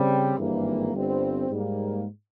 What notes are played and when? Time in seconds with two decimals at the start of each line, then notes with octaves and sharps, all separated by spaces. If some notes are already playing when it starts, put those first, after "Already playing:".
Already playing: C#3 G3 C4
0.36 G#1 G2 E3 A#3
0.93 G1 G2 G3 C4
1.49 G#2 G3 A#3